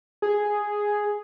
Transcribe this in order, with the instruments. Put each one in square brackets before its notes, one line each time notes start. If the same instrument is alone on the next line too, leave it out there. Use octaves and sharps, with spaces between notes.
[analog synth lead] G#4